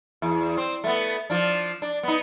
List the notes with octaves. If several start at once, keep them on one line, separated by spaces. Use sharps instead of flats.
E2
C4
A3 B3
F3 D4
D4
B3 D#4